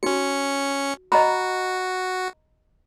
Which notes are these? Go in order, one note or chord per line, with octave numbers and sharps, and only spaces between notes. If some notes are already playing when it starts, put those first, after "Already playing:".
C#4 D#4 F#4 C#7
F#4 D#5 A#5 B5